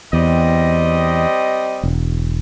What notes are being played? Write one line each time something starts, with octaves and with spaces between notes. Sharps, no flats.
E2 G3 C4 D#5
E1